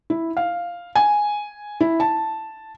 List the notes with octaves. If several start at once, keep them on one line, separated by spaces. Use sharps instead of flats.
E4
F5
G#5
E4
A5